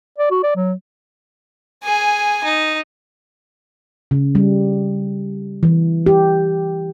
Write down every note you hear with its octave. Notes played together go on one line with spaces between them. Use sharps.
D5
F#4
D5
F#3
G#4 G#5
D#4
C#3
G3
E3
G4